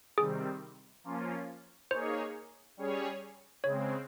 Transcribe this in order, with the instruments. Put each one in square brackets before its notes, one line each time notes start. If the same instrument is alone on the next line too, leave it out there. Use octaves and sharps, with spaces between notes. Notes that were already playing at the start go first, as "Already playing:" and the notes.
[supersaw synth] C3 D#3 G3 C4 [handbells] G#4
[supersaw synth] F3 A#3 C#4 F4
[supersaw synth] A#3 D#4 G#4 C#5 [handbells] C5
[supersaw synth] G3 C#4 G#4 C#5
[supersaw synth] C#3 G#3 C4 [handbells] C#5